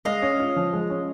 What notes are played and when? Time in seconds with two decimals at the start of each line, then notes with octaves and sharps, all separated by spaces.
0.05 G#3 D#5 F5
0.22 C#4
0.40 F4
0.56 F3
0.73 G#3
0.90 C#4